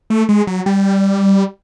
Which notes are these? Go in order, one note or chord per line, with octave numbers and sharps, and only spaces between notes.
A3
G#3
F#3
G3